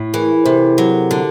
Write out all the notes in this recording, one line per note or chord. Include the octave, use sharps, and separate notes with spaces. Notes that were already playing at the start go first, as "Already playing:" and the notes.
Already playing: A2
E3 G#4 A#4
C3 G4 A4
F#3 G4 A4
D3